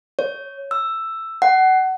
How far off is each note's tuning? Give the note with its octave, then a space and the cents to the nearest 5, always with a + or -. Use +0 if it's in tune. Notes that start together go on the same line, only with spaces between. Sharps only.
C#5 +0
E6 +5
F#5 +25